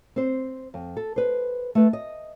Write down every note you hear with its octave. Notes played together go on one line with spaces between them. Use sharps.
C4 C5
F2
A4
B4 C5
A3 B4
D#5